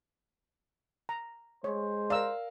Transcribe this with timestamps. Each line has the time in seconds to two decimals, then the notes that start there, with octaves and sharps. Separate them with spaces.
1.09 A#5
1.64 G#3 C5 C#5
2.10 A#4 D5 F5 A#5 E6